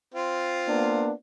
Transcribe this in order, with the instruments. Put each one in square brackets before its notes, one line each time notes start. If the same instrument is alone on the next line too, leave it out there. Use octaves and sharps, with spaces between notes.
[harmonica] C4 F4
[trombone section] A#3 B3 D4